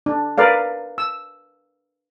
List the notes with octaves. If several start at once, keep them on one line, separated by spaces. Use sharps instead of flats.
D4
A#4 B4 D5 F5
E6